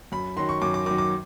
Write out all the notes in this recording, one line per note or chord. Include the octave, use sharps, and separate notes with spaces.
F#2 B5
D#3 F#3 C6
C#6
F#2 D6
D6
D#3 F#3 D6
D6